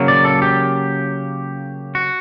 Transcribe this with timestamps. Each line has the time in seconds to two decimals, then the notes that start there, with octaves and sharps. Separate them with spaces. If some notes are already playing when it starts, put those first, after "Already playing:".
Already playing: C#3 F#3 A#3
0.08 D5
0.25 A4
0.42 G4
1.95 F#4